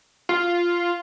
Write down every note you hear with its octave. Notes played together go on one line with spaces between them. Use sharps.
F4